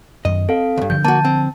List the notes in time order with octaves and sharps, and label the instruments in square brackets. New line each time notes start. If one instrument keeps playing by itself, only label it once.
[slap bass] F#2 D#3 [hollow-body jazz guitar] D#5
[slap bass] C4 [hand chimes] A4 F5
[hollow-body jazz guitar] D2 G2
[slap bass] D3 F3 [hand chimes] G6
[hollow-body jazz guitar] A#3 F#4 [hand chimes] A5
[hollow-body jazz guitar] C4